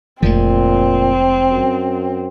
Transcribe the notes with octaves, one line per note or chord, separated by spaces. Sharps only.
F1 A#2 F3 G#3 C4
F#2